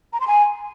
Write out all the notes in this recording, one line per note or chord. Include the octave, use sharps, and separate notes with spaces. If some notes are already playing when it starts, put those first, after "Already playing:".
A#5
C6
G#5